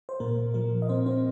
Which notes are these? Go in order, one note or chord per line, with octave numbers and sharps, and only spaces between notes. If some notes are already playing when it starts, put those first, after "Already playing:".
C5
A#2 A#3 A#4
F3 A#3 A#4
D#5
A#2 C4 C5
C4 C5